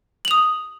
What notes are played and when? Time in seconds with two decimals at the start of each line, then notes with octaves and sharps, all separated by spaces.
0.25 F#7
0.28 F7
0.31 D#6